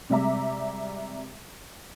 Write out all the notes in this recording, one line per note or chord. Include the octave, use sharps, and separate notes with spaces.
C3 G3 G#3 E5 A#5 D6